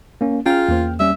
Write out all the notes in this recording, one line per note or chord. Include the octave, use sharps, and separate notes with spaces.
A#3 C#4
C#4 F4 G#4 G5 A#5 F6
E2 A#3 C5
G3 C#4 E5